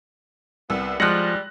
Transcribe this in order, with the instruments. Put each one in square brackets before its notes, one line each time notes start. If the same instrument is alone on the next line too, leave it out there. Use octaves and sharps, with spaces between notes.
[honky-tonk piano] C2 E6 [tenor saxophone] B3
[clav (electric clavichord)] F3 F#5 [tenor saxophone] G3 [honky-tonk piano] G#3 [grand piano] F#6 A#6